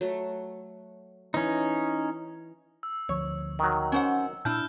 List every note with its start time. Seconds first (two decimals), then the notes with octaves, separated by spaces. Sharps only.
0.01 F#3 A3
1.34 E3 C#4 D#4
2.83 E6
3.09 D2 F3 C#5
3.59 D#3 F#3
3.92 C#4 C5 F#5
4.45 A#2 D4 E4 A5 F6 G6